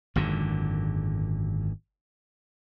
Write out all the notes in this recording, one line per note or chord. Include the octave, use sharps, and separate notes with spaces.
G#1 F#2 A#2 D3